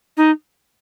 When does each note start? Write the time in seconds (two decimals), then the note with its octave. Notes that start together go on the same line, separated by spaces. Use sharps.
0.17 D#4